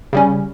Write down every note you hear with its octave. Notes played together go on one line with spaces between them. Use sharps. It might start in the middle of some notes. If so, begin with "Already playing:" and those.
C#3 G3 C#4